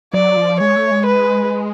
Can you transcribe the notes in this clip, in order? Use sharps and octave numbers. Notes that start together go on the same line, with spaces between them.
F#3 D5
F3
G#3 C#5
A3
G#3
B4